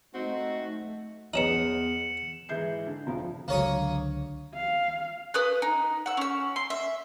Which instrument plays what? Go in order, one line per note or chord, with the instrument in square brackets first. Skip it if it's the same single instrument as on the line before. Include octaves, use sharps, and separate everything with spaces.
[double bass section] A3 [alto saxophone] C4 [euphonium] D#4 [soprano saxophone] F#4
[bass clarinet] E2 [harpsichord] B3 C#4 D#4 [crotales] C#7 E7 F#7
[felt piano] G#2 E3 G#3 E4 G6 C7
D3
F1 F3
[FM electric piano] C#2 D3 F#3 [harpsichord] A#3 C#5 D#6
[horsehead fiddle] F5
[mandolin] B4 D#6 F#6
D#4
F#5 E6
C#4 E6
C6
E5